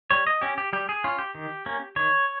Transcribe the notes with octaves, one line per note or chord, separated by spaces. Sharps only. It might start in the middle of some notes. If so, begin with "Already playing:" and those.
G3 C#5
D#5
C#4 G4
G4
G3 G4
G#4
C#4 F4
G4
D#3
A#3 C#4
D#3 C#5